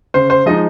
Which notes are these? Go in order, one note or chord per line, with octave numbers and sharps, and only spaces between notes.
C#3 C5
C5
F3 G#3 D#4 D#5